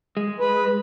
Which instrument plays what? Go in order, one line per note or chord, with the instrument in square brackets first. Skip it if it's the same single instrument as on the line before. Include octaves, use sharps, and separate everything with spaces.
[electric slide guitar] G#3
[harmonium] B4